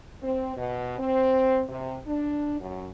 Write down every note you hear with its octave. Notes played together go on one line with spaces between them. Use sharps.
C4
B2
C4
C3
D4
F#2